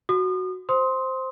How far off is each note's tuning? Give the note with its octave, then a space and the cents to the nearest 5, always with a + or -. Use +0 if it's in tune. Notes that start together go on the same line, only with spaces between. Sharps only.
F#4 +0 D#6 -40
C5 +0 C6 +0 D#6 +30